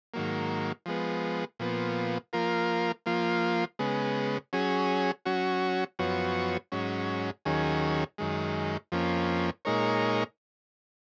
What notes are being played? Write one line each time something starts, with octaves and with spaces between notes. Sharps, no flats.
G#2 D#3 F#3 A#3
F3 G#3 B3
A#2 F3 B3
F3 A#3 F4 A#4
F3 A#3 F4
C#3 G#3 B3
F#3 C#4 G#4
F#3 C#4 F#4
F#2 F3 B3 F#4 C#5
G#2 F#3 C#4
D#2 D#3 F#3 C#4 G#4
F#2 D#3 G#3
F2 F3 A#3 C#4
A#2 G#3 D#4 A#4 C#5